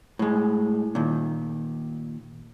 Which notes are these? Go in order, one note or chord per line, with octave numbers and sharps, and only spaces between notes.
A2 G#3
A#2 D#3